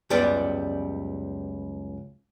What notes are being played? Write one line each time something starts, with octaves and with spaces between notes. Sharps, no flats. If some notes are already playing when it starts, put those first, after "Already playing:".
C#2 F#2 G3 B3 D5